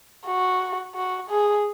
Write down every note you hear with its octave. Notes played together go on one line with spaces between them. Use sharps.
F#4
F#4
G#4